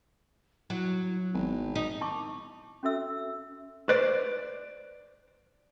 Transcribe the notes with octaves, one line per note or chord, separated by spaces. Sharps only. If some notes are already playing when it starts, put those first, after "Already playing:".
F#3 E4
G#1 B3
D#4
E4 A5 C#6 D6
C#4 F#4 A4 E5 E6
B4 C5 D5